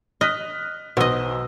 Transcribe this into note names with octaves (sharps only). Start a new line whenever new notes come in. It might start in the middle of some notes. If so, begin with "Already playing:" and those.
D#5 F6 F#6 B6
B1 B2 C5 D#5 E6